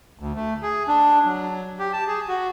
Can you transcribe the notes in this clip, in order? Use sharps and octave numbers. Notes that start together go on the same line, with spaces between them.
D2
A3
G#4
D4
F#3
G4
A5
G#4
F#4